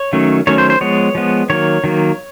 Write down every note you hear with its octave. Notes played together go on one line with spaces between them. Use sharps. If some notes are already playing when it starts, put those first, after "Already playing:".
Already playing: C#5
D#3 F#3 A3 C#4
D#3 F#3 A3 C#4 C#5
C5
C5
F3 G#3 B3 C#5
F3 G#3 B3
D#3 F#3 A#3 C#5
D#3 F#3 A#3